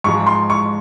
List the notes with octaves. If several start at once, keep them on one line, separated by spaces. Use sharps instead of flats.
G#2 F3 G#3 C#6
C6
C#6